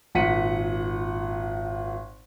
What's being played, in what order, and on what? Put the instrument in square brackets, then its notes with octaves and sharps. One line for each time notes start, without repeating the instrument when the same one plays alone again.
[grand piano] G#1 A#2 F#5 B6 C#7 D#7